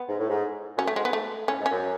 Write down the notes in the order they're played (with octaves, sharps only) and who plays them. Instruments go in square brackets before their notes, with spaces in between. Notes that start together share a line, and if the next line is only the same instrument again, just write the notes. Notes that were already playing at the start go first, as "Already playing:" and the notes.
Already playing: [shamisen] B3
[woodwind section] G#2
A2
G#2
[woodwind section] F#2 [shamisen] C#4
[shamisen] A3
[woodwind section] G#2 [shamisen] G#3
[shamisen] B3
A3
[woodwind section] A2 [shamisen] C#4
[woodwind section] G#2
[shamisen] C#4
[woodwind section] F#2